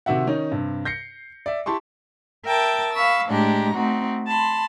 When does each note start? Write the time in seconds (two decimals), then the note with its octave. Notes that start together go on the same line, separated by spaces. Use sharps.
0.06 C3 D#3 F#4 E5 F#5
0.27 D#3 C#4 D#4
0.51 G2 C3
0.85 G6 A#6 C7 C#7
1.46 D5 E5
1.66 E4 G4 A5 C6 C#6
2.46 A#4 E5 G5 A5
2.94 F5 B5 C#6 E6
3.29 A2 G#3 D4 G4 A#5
3.74 A3 C4 D#4 F#4
4.27 A5 B5 C6